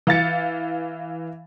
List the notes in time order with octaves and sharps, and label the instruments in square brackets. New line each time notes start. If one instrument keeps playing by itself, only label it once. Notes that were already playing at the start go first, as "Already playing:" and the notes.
[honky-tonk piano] E3 F5 A6 C#7